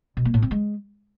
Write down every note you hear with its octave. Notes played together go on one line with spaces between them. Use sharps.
B2
A#3
A2
C4
G#3